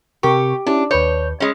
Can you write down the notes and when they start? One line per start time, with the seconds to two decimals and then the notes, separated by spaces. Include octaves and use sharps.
0.23 C3 G4 A#4 C#6
0.67 C#4 D4 E4 G4
0.91 D#2 B4 C#5 G6
1.40 G#3 C#4